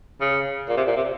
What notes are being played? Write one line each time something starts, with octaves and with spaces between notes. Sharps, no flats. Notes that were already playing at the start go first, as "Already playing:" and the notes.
C#3
A#2
C3
A#2
C3